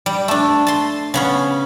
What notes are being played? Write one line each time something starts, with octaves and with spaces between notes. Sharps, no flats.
G3
A3 D4
A5 C6
C#3 B3 C#4